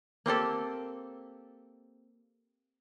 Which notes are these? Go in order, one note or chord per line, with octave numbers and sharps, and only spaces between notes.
A#3 C4 G4 A4